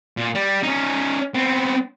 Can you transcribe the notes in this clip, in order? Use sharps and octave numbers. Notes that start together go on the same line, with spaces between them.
A#2
G3
C#4 D#4
B3 C4